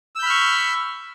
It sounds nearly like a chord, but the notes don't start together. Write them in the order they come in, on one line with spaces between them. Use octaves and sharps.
E6 G6 B5 F6 C#6